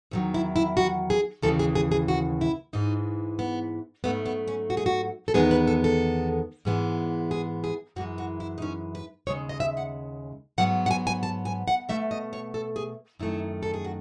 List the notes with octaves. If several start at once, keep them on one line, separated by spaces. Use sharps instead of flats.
E2 D#3 F#3
E4
E4
F#4
G#4
D#2 C#3 E3 G#3 A4
G#4
G#4
G#4
F#4
E4
G#2 E3 G#3 D#4
B3
G#2 F#3 A3 B3
B3
C#4
F#4
G#4
F#4
A4
E2 D#3 G#3 B3 G#4
B4
A4
A4
G#2 E3 G#3 B3
G#4
G#4
F#2 E3 G#3 F#4
F#4
E4
D#4
C#4
B4
D#2 C#3 G#3 C#5
D#5
E5
F#5
G#2 F#3 B3 F#5
F#5
G#5
G#5
A5
G#5
F#5
B2 A3 E5
D#5
C#5
A4
G#4
F#2 D#3 A3 E4
A4
G#4
F#4